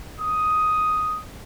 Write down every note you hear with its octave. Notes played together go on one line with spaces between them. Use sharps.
D#6